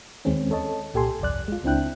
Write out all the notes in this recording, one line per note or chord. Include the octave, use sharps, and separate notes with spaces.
D#2 D#3 G#3 C4 C#4
A4 C#5 D#5 A5
C2 A#2 G4 A4 G#5 C6
G1 C2 F2 D5 F#6
G#3 F4
C#2 C4 D4 E4 G5 F#6